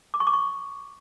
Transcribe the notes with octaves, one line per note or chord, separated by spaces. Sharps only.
D6
C#6
D6
C#6